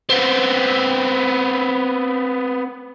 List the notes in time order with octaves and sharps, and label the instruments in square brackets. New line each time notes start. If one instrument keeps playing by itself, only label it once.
[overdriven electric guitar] B3 C4